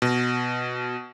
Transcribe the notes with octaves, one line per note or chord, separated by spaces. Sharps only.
B2